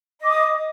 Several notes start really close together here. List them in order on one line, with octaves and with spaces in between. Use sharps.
D#5 D6 D#6